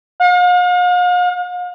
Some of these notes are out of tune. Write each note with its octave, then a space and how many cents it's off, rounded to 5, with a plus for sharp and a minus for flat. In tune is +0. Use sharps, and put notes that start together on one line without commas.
F5 +45